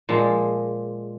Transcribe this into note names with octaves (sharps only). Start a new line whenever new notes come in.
A#2 F3 G#3